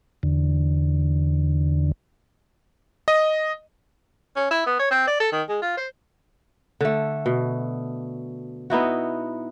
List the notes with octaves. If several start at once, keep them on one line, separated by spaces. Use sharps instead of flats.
E2 D3
D#5
C#4
E4
B3
C#5
C4
D5
A4
D#3
G#3
F4
C5
D3 A3
B2
B3 D#4 E4 F#4